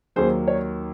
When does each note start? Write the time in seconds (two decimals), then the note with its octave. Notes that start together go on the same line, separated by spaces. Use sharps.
0.16 D#2 D#3 F#3 G#4 C5
0.48 C#5